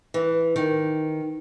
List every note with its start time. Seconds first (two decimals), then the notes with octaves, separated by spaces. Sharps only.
0.14 E3
0.56 D#3